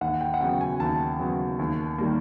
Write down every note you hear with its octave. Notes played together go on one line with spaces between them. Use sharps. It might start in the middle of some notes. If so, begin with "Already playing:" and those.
D#2 F#5
G5
F#5
C#3 F#3 B3 G5
G#5
D#2 A5
C#3 F#3 B3
D#2
D#3 G3 A#3